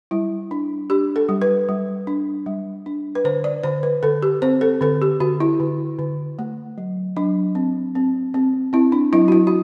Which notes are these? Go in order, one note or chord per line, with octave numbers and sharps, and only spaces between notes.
G3 E4
D4
D4 G4
A4
G3
B4
G3
D4
G3
D4
B4
D3 C5
D5
D3 C5
B4
D3 A4
G4
C4 C5
A4
D3 A4
G4
D3 F#4
E4
D3
D3
A3
F#3
F#3 D4
C4
C4
C4
C4 E4
D4
F#3 E4
F#4
E4
F#4